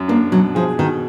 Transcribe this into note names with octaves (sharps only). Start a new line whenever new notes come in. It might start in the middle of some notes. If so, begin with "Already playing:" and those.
Already playing: F#2
A#3 D4
B2 F#3
F3 G#4
B2 D#3